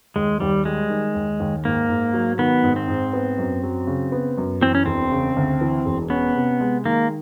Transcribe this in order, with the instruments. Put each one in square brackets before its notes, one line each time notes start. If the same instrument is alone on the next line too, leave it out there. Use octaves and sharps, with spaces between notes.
[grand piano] D#2 [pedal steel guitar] G#3
[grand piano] D#2 [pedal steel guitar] G3
[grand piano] G3 [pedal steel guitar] G#3
[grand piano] D#3
D#2
D#2
[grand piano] G#2 [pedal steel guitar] A#3
[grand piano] G#2
F#3
[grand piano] D#3 [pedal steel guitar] B3
[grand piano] G#2
[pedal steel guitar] C4
[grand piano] G#2
B3
F#2
F#3
C#3
B3
F#2
[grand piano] E3 [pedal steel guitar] C4
[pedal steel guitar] C#4
[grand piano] E1 [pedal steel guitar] C4
[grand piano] C#3
D2
E3
E1
[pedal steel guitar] B3 [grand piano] C#4
[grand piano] C3
G#3
[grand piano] D#3 [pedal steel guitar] A#3